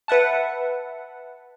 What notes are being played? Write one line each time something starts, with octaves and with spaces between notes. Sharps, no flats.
B4 E5 F#5 A5